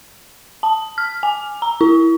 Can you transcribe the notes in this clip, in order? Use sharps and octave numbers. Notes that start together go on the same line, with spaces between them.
A5
F6
G#5
A#5
E4